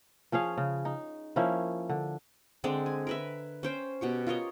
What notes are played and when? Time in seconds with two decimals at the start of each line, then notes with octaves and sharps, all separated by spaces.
0.32 F3 C#4 G#4 F5
0.58 C#3
0.85 D#4
1.36 F3 A#3 C#4 E4
1.89 D3
2.64 D3 G#3 C4 D5
2.86 G#5
3.07 A#4 B4 E5
3.63 C#4 C5 G5
4.01 B2 G4 C#6
4.27 F4 A#4 C#5 D#5